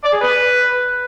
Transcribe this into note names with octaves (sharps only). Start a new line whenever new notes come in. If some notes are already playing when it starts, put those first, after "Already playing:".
D5
G#4
B4